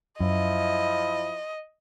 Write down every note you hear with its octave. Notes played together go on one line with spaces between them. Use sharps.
F#2 F3 E4 D#5